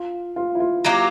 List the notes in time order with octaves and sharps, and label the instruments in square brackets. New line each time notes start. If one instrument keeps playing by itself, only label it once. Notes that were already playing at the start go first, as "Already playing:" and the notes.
Already playing: [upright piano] F4
F4
E4
F4
[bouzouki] F#3 A#3 D#4
G4